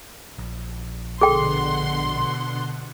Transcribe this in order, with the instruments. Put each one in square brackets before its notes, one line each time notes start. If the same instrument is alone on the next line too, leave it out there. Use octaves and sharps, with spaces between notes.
[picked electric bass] A#1
[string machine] B2 D3 F#5 [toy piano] G#4 A4 G5 [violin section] C6